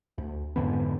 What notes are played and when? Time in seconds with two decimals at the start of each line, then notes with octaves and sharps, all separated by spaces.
0.18 D2
0.56 F2 G#2 D3 B3